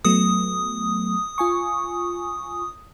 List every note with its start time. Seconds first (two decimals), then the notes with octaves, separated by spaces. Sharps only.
0.05 F#3 A3 B3 D#6
1.38 F4 G#5 C#6